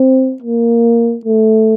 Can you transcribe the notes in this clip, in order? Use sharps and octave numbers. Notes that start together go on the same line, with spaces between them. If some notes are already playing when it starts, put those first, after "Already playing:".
Already playing: C4
A#3
A3